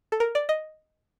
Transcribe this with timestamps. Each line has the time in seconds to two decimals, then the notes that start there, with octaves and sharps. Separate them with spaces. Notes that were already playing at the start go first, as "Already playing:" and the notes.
0.12 A4
0.20 A#4
0.35 D5
0.49 D#5